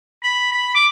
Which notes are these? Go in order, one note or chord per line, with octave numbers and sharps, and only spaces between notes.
B5
B5
D6